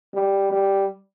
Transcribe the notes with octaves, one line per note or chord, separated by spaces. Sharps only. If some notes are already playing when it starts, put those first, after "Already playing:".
G3
G3